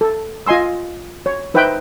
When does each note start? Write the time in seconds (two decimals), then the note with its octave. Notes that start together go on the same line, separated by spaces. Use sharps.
0.01 A4
0.47 F4 D#5 G#5 C6 E6
1.26 C#5
1.54 D#4 B4 C5 E5 G5